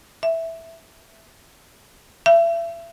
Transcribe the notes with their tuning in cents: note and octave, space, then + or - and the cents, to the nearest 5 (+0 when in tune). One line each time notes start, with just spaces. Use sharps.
E5 -5
E5 +35